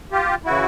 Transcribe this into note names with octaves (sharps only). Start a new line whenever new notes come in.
F4 G4
C#3 E3 E4 F#4